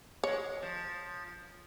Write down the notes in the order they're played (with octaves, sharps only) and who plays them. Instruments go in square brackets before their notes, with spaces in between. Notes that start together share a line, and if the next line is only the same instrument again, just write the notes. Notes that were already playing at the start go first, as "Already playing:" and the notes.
[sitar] G#3 [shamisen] C#5
[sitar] F3